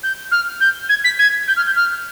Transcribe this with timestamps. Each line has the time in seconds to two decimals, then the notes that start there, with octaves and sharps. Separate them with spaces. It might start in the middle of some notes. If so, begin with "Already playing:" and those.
0.03 G6
0.31 F6
0.60 G6
0.89 G#6
1.04 B6
1.19 G#6
1.48 G6
1.56 F6
1.66 G6
1.76 F6